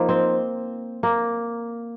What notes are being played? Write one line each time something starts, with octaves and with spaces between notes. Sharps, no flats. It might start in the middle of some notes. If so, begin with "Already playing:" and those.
Already playing: F3 A#3 D#4 C5
C4
A#3